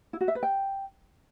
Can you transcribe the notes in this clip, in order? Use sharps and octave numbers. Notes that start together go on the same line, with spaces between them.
E4
F#4
E5
B4
G5